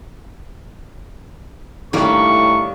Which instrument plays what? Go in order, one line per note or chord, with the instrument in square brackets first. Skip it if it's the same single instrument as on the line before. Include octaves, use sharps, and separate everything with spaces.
[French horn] A2 [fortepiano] D#3 D4 [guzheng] G3 A#3 [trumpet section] C#6